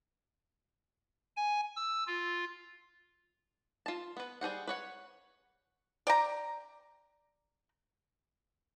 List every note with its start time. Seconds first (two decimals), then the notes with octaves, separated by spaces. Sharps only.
1.37 G#5
1.76 E6
2.07 F4
3.86 F4 A5
4.17 B3 B4
4.41 G3 G#4 C5 F#5
4.67 B4 C#5 F#5
6.07 D5 G5 A#5